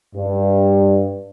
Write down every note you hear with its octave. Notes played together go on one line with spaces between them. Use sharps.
G2